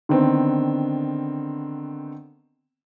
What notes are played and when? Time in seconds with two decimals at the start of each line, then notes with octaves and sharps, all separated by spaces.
0.09 D3 D#3 B3 C4